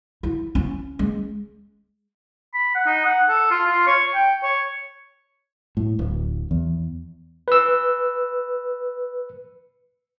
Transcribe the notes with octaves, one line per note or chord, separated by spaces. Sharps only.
E4
C#4
G#3
B5
F#5
D#4
F#5
A4
F4
F4
C#5
G5
C#5
A2
D1
E2
B4 E6